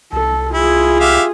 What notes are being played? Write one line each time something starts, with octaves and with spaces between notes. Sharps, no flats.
C2 A4
E4 F4 G#4
G4 E5 F5